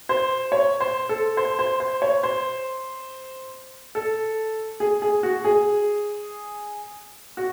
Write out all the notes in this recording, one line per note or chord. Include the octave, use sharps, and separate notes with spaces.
C5
C#5
C5
A4
C5
C5
C5
C#5
C5
A4
G#4
G#4
F#4
G#4
F#4